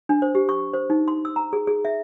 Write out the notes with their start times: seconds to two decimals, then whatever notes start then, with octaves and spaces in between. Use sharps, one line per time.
0.09 D4
0.22 C5
0.35 G4
0.49 C#6
0.74 C5
0.90 D#4
1.08 C6
1.25 E6
1.36 A#5
1.53 G#4
1.67 G#4
1.85 E5